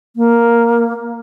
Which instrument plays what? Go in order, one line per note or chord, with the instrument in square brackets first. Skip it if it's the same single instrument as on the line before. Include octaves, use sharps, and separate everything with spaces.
[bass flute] A#3